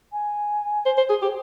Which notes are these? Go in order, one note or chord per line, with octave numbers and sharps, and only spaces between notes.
G#5
C5
C5
G#4
G4